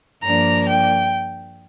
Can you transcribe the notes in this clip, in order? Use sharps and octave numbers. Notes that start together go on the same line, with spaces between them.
G2 F3 A#3 D4 A#5
G5